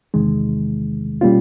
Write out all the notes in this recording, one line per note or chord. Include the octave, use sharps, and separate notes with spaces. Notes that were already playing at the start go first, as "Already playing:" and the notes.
E2 C3 D#3 G#3
B2 G3 A#3 C#4 F4